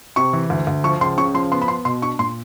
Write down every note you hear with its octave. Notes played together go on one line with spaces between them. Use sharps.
C3 C#6
E3
D2
D2
F3 C#6
C#2 C6
C#3 C#6
F3 C6
B3 C6
B5
B3 C6
B2 C6
D4 C#6
A#2 C6